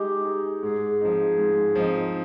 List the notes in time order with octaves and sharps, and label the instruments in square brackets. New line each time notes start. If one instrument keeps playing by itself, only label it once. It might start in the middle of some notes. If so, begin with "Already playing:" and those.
Already playing: [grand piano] G#3 D#4 G#4 [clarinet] G4
[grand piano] D#4 G#4
[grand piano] G#2 [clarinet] G#4
[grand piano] F3 C4 D#4
G#2
F3 C4 D#4